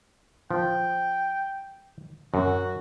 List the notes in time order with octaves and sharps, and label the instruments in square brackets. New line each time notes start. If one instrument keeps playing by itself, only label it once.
[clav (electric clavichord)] F3 [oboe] G5
[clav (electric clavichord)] F#2 [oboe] F#4